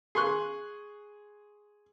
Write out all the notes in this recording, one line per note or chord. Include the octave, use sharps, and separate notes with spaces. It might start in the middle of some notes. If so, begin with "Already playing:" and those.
G#4 C6 C#6 F#6